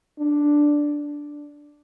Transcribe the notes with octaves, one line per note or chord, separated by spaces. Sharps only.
D4